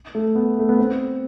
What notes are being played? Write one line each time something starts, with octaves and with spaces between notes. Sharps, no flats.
A3
B3
A3
B3
C4